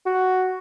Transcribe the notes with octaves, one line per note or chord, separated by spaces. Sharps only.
F#4